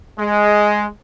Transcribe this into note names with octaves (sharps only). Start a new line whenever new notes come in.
G#3